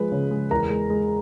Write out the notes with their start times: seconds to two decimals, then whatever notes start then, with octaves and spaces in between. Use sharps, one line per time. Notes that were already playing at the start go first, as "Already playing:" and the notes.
Already playing: F3 G#3 B4
0.12 C#3
0.31 G#3
0.51 E2 A#4 A#5
0.70 G#3
0.90 G#3